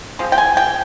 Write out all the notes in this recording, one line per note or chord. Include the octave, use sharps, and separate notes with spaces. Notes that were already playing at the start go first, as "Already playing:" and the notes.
F3 G#3 C4
G5
G#5
G5